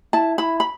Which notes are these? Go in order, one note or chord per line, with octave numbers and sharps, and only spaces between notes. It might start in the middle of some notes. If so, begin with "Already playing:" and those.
E4 A5
E4 B5
B5